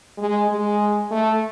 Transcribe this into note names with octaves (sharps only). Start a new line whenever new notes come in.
G#3
G#3
A3